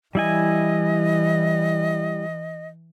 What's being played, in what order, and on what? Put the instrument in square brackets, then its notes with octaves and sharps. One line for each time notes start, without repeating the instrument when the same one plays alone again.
[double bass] E3 [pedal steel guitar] G3 E4 G#5 [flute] D#5